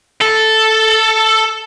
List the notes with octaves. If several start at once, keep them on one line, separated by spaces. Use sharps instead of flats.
A4